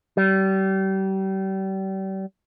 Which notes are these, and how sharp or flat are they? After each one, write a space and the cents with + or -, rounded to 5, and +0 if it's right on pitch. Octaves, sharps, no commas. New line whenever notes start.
G3 -35